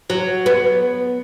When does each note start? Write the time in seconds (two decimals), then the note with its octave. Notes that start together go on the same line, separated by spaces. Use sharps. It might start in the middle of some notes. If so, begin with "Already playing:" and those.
0.10 F#3
0.46 B3